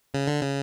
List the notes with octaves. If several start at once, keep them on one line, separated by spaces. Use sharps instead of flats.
C#3
D3
C#3